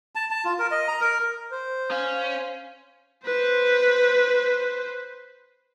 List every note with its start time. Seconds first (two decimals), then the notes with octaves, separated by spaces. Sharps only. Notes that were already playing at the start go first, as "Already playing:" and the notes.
0.15 A5
0.30 A5
0.45 F4
0.59 A#4
0.71 D#5
0.88 A#5
1.01 A#4
1.51 C5
1.91 C#4 F5
3.26 B4 C5